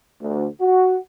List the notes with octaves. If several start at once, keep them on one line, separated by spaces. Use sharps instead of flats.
D2
F#4